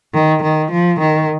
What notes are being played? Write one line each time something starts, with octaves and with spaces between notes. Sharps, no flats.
D#3
D#3
F3
D#3